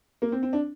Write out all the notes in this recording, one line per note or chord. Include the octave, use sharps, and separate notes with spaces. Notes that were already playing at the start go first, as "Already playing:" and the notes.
A#3
C4
C4
D4